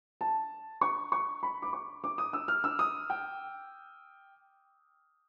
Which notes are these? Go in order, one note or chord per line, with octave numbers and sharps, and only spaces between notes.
A5
C#6
C#6
B5
D6
C#6
D6
D#6
E6
F6
E6
D#6
G5